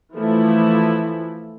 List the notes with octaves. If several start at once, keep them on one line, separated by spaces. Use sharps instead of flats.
E3 F3 A3 E4